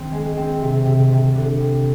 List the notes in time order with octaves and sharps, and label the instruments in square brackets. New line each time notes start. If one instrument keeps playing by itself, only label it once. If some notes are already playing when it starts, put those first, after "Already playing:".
Already playing: [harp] D#3 C4
G#3
C4
C3
C3
C3
D3
C4